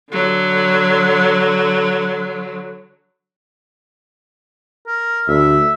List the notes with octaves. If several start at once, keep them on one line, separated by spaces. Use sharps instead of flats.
D3 F#3
A#4
D2 E5